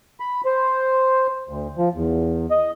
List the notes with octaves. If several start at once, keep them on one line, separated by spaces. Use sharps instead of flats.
B5
C5
D2
F3
E2
D#5